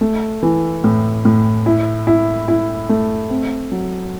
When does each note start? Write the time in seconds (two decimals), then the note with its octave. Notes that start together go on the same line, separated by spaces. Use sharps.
0.01 A3
0.43 E3
0.84 A2
1.25 A2
1.66 E4
2.07 E4
2.48 E4
2.89 A3
3.30 C4
3.72 F#3